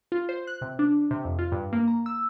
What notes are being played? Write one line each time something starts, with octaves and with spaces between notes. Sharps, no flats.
F4
C5
F#6
C3
D4
C3
F2
F4
G2
A#3
A#5
E6